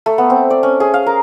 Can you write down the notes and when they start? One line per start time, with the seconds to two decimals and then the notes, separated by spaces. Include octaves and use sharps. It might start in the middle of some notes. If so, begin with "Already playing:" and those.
0.06 A3
0.18 B3
0.30 C4
0.50 D5
0.63 C#4
0.80 G#4
0.94 F5
1.06 A#4